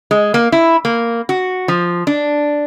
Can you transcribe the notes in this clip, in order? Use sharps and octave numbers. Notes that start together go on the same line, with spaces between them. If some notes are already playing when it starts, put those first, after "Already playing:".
G#3
A#3
E4
A#3
F#4
F3
D4